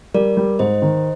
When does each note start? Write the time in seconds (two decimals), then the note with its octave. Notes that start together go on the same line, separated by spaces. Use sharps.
0.14 G3 A#4 D5
0.37 G3
0.59 G#2 C5 D#5
0.82 D#3